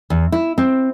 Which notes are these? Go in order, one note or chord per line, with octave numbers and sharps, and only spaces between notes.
E2
E4
C4